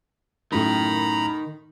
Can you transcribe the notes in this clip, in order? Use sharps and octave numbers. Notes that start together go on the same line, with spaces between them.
F#2 A2 D#3 A#5 B5